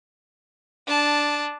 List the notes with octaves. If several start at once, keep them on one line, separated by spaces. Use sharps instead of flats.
D4 A5